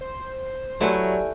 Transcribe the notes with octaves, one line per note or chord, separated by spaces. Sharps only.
C5
F#3 A3 E4 G4 B4 D5 G#5